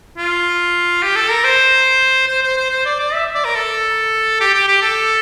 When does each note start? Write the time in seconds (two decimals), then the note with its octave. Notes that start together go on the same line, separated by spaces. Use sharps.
0.18 F4
1.03 G4
1.16 A4
1.30 A#4
1.44 C5
2.28 C5
2.43 C5
2.57 C5
2.71 C5
2.86 D5
3.00 D5
3.14 E5
3.35 D5
3.45 A#4
3.55 A4
4.40 G4
4.54 G4
4.68 G4
4.82 A4